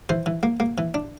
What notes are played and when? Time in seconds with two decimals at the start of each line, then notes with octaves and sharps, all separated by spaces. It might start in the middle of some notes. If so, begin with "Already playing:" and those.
0.09 E3 C5
0.26 E3
0.43 A#3
0.60 A#3
0.78 E3
0.94 D4